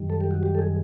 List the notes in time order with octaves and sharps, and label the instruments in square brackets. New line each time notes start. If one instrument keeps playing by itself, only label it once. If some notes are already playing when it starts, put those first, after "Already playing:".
Already playing: [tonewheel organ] F#2 D#3 G3
A4
G4
F#4
G4
A4
G#4